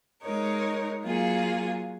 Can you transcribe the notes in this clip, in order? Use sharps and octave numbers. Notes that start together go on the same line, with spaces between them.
G#3 D#4 A#4 C#5
F#3 A#3 F4 G#4